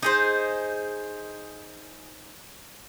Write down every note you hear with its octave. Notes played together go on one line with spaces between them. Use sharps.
D#4 G#4 C5